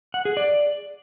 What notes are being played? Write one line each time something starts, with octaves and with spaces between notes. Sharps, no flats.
F#5
G#4
D5